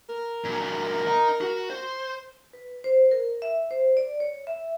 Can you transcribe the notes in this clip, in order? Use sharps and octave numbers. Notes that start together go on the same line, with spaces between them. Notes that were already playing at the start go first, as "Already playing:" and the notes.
A#4
A#2 F#3
D#5 A#5
F#4
C5
B4
C5
A#4
E5
C5
D5
C#5
E5